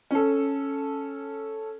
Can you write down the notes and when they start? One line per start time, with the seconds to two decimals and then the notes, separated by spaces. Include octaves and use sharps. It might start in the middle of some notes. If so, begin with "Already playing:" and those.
0.11 C#4 A4